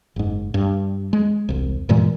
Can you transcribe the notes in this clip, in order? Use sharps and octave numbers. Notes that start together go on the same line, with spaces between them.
F#1 G#2
G2
G#3
E1 C2
G2 A#2 E3 G#3